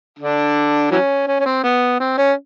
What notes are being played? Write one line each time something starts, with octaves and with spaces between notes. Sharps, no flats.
D3 D4
E3 F#3 C#4
C#4
C#4
C4
B3
C4
C#4